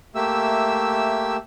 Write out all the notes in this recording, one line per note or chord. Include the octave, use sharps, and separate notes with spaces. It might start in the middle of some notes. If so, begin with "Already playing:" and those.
A3 A#3 G4 E5 E6